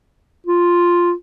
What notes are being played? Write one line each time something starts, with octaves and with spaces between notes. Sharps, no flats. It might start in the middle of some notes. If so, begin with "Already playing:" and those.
F4